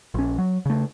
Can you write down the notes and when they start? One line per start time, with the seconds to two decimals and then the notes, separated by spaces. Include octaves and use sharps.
0.14 A#1 C#4
0.38 F#3
0.66 C#3 A3